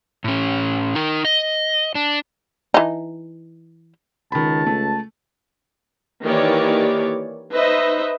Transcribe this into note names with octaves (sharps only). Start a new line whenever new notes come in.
A2 C#4
D#4 A#4
D#5
D4
E3 D#4
C#2 D#3 A5 B5
A3
D#3 E3 A#3 G4 C#5 D5
D#4 B4 C5 D#5 E5